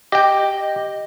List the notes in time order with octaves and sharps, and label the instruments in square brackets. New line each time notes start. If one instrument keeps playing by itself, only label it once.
[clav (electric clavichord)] G4 G5 [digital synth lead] D#5